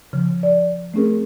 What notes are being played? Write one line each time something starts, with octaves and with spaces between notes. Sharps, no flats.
C#3 F3
D5
A3 C4 C#4 G#4 A#4